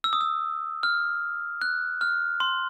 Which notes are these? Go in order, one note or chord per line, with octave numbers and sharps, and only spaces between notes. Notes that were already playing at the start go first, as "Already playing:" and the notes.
E6
D#6
E6
F6
F#6
F6
C6